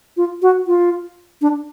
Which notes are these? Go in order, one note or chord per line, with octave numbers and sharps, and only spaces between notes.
F4
F#4
F4
D4